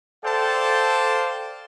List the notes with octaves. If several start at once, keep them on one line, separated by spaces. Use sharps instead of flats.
A4 C5 D5 F5 G5 A5